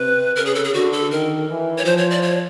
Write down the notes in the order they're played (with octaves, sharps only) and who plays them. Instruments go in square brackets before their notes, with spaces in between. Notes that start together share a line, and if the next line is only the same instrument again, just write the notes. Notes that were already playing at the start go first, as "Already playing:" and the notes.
Already playing: [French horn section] C3 [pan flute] B4
[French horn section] C#3 [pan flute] A#4
[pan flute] G#4
A4
G#4
[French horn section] D3 [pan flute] F#4
[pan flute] A4
[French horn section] D#3 [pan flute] A#4
[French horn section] E3
[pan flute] C#5
[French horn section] F3 [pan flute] C5
[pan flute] C#5
D5
C#5